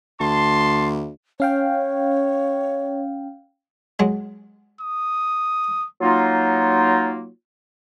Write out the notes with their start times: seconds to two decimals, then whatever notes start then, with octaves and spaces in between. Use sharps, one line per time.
0.20 D2 A5 C6
1.40 C#4 C#5 F5 G5
3.99 F#3 G#3
4.81 D#6
6.01 F#3 A#3 D#4 F4